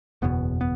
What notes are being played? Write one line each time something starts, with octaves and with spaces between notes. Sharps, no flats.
F#1 E2 B2 B3
B3